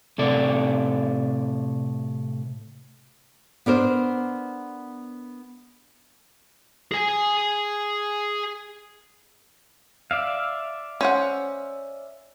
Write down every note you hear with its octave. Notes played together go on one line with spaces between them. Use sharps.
A2 C3 A4 D5
B3 D4 A#4 C5
G#4 G#5
D5 E5 F5
C#4 C5 F#5